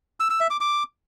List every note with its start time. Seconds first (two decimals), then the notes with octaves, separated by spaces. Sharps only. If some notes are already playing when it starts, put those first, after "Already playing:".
0.20 E6
0.30 E6
0.40 E5
0.50 D6
0.61 D6